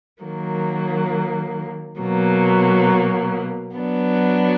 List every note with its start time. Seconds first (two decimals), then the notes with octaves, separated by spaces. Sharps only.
0.23 D#3 F#3 A#3
2.00 B2 F#3 A#3
3.77 F#3 B3 D4